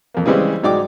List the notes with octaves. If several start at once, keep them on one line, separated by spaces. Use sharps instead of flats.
F2 A#3
C#3 E3 G3 G#3 C4
G#2 F#3 D#4 D5 G5 D6